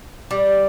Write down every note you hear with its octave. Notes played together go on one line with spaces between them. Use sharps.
G3